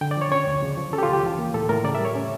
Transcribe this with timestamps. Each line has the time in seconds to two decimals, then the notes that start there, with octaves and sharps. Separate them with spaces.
0.01 D3 G5
0.11 D5
0.17 F3 C#5
0.32 C#4 C#5
0.47 D2
0.63 C#3
0.77 F3
0.93 C#4 A4
0.98 G4
1.03 F4
1.09 C#2 G4
1.23 E3
1.39 A#3
1.54 A2 A4
1.69 A2 A#4
1.84 C#3 D5
1.95 E5
1.99 G3
2.05 C#5
2.15 C#4